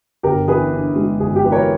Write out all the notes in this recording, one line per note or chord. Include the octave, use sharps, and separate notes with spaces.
G1 G4 A#4
E3 G#4 B4
G2
G#3
G1 G#4
G4
E3 B4
A#4 C#5